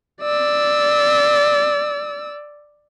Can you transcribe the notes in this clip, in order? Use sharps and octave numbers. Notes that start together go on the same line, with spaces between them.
D5 E6